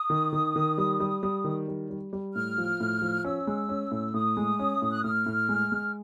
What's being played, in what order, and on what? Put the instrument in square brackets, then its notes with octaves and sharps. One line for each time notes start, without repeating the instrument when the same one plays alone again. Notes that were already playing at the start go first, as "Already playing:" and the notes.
Already playing: [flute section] D#6
[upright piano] D#3
D#3
D#3
G3
G3
G3
D#3
G3
G3
G3
[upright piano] A2 [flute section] F6
[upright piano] F3
A2
F3
[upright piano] C#4 [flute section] E6
[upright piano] G#3
C#4
A2
[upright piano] A2 [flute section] D#6
[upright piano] G#3
C#4
A2
[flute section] F#6
[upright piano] A2 [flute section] F6
[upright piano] A2
G#3
G#3